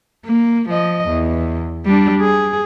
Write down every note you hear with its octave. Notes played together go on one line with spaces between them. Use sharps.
A#3
F3 D#5
E2
G3 D4
G#4